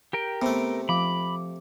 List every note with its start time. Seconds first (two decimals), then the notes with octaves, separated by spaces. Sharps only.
0.13 G4 A#4 G5
0.42 C3 A3 B3
0.89 F3 B5 D6